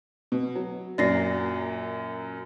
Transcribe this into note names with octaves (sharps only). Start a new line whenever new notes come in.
B2
F#3
F#2 A#2 F#3 D5 A#6 C7